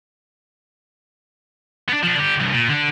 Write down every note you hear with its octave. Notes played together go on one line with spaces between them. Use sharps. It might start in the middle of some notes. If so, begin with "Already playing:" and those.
B3 D4
F3 D4
D3 G4
C2 G2
A#2
D3 D4